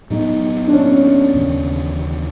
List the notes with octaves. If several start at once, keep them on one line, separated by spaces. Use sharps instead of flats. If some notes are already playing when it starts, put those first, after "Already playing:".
A2 F#3 B3 D#4
D4
C#4
D#2 C#3 E3